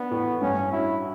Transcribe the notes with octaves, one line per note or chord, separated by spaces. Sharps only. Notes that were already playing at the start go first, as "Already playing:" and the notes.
Already playing: B3 D4
A2
G2 C#4
E4 F#4